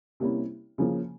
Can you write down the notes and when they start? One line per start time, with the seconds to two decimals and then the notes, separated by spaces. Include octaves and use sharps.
0.20 C3 G3 A#3 C#4 E4
0.78 C#3 F3 A#3